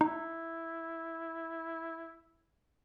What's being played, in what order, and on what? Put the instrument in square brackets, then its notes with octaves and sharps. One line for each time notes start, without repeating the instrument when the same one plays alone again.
[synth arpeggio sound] D#4 [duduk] E4